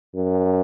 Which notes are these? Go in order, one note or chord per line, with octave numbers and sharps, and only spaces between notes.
F#2